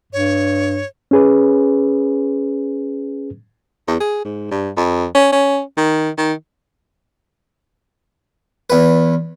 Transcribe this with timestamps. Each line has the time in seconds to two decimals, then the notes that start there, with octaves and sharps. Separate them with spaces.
0.13 G2 C#5
1.11 C#4 G#4 B4
3.88 E2
4.00 G#4
4.25 G#2
4.51 G2
4.77 F2
5.15 C#4
5.32 C#4
5.77 D#3
6.18 D#3
8.70 E2 B4